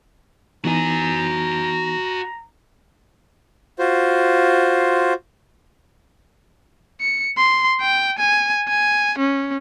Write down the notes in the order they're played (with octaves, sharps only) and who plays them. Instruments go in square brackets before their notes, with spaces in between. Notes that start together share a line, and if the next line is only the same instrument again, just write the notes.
[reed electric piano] E3 B3 D#4 [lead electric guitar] F#4 G#5 [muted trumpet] A#5
[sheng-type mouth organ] F4 F#4 C5
[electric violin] C#7
C6
G5
G#5
G#5
C#4